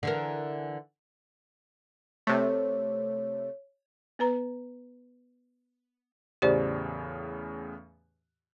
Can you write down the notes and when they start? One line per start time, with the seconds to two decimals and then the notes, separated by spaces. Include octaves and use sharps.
0.03 D3 E3 A#4
2.27 C3 A3 C#5
4.19 B3 B4 A#5
6.42 E2 A2 C#3 G4 C5 D5